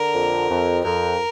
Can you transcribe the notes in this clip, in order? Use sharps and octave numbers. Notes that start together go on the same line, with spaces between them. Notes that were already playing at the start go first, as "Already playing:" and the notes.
Already playing: D3 A#4
F2
F2
F2 A#4